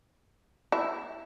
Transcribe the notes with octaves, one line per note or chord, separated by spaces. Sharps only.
E4